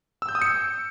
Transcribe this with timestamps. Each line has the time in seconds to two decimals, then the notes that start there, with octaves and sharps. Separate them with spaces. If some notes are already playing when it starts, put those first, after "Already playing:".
0.22 E6
0.29 G6
0.35 D#6
0.42 C#7